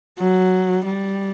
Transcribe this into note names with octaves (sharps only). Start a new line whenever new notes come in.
F#3
G3